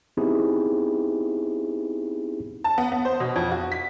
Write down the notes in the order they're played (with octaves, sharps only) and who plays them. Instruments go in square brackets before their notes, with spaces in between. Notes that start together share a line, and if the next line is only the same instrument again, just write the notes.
[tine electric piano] B3 C4 D#4 E4 G4 G#4
[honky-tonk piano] A5
B3
B3
C5
B2
F2
F#4
B6